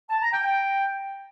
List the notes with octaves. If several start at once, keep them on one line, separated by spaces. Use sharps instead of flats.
A5
A#5
G5
G5